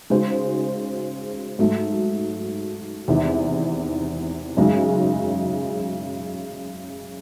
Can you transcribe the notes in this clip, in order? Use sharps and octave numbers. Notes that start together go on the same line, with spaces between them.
C#3 G#3 D#4 F#4 C5
G#2 F#3 A3
E2 C3 D#3
F#2 C#3 G#3 D#4 F#4